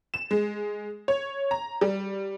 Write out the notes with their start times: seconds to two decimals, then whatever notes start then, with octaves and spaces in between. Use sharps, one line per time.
0.14 E7
0.31 G#3
1.08 C#5
1.51 A#5
1.81 G3